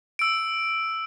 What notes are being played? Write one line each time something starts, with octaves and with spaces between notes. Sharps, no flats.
E6 D7